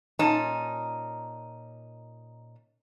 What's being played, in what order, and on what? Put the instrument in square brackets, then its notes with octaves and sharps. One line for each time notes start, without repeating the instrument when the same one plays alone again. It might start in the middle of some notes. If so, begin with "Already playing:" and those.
[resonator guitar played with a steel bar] A#2 C#4 D#4 A5